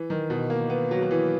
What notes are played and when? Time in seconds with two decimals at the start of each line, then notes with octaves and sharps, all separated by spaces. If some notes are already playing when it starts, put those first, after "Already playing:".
Already playing: E3
0.10 D#3
0.30 B2
0.50 A#3
0.70 B3
0.91 F#3
1.02 F#3
1.11 E3